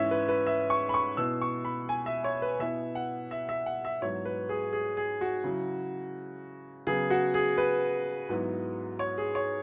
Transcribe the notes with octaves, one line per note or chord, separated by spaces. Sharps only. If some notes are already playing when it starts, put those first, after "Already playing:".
Already playing: G#2 E3 C#4 E4 C#5 E5
B4
B4
E5
C#6
B5
C#6
B2 B3 E4 E6
C#6
B5
G#5
E5
C#5
B4
B2 B3 E4 E5
F#5
E5
E5
F#5
E5
G#2 F#3 B3 E4 C#5
B4
G#4
G#4
G#4
F#4
C#3 F#3 E4
C#3 F#3 B3 G#4
F#4
G#4
B4
G#2 F#3 B3 E4
C#5
G#4
C#5